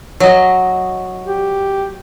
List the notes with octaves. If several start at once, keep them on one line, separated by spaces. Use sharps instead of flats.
F#3 D#5
G4